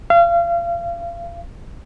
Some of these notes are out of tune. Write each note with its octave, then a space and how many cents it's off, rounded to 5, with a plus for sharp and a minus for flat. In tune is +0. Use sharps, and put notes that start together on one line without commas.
F5 -35